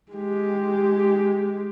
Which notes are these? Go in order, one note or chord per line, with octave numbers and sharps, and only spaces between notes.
G#3 G4